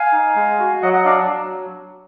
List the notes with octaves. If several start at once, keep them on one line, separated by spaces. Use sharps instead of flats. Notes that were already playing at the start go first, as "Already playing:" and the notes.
Already playing: F5 G#5
D#4
G#3
F#4
F#3 D#5 F#5
D#5 F#5
D4 D5 F5
F#3